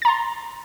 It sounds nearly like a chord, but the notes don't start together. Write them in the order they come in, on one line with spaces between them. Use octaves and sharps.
A6 A#5 C6